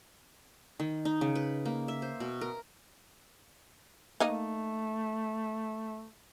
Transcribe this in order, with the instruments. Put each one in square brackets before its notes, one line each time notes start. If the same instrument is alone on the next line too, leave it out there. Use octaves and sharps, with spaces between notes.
[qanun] D#3
D#4
C#3
B4
A#3
E5
C5
B2
A#4
[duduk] A3 [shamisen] A#3 D#4 D#5